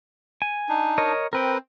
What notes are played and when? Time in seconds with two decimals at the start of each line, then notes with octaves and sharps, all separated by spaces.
0.42 G#5
0.69 D4 D#4
0.98 A#4 C#5 D#5
1.33 C4 A#4 B4 G5